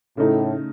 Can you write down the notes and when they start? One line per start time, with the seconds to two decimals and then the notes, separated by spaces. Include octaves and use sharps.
0.17 A2 C#3 A3 D#4